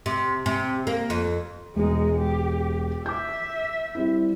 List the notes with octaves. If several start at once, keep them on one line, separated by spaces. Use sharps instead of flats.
C3
C3
A#3
F2
E1 G#3 D#4
G4
E5 D6 G6
G3 C4 E4